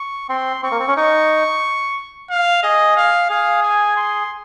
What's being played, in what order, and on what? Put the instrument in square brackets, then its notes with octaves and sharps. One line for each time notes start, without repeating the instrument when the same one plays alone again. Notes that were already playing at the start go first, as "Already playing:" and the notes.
Already playing: [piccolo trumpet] C#6
[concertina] C4 [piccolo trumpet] C6
[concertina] C4 [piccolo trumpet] C#6
[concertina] A#3
C4
C#4
[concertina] D#4 [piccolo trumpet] C#6
[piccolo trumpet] F5
[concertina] G#4 [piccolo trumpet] D#5
[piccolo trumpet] F5
[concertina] G#4 [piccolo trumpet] F5
[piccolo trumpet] G#5
C6